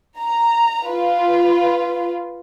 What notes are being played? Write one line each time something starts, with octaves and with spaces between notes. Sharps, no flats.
A#5
F4 B4